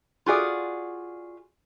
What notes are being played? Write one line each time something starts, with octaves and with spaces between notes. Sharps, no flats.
F4 F#4 G#4 D5